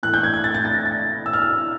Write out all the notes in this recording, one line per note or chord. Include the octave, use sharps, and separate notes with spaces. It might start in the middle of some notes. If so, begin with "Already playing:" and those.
A2 E3 A3 F#6
G6
G#6
G#6
A6
A6
A6
A#6
A6
E6
F6
E6